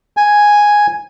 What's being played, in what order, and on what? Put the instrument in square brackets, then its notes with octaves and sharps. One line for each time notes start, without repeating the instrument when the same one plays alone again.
[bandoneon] G#5